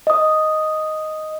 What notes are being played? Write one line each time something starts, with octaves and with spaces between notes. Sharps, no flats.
D#5 D#6